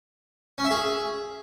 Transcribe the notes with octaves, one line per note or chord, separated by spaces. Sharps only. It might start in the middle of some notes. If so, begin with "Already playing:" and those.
C#4
E5
G#4